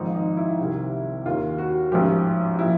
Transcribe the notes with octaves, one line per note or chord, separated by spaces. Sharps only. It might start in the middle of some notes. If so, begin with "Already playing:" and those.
Already playing: G#1 G#2 F3 D#4
D#4
E4
C2 C3 D#3
D#2 D#3 F4
F#4
A1 G#2 F3 G4
A#2 F3 E4